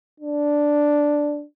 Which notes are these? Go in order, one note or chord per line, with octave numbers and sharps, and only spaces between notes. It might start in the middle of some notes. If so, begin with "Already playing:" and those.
D4